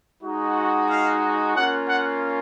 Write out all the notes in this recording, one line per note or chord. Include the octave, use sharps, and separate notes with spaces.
G#3 D#4 F#4
F5
A#3 C#4 F4 F#5
F#5